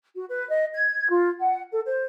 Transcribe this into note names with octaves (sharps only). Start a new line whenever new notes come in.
F#4
B4
D#5
G#6
F4
F#5
A4
C5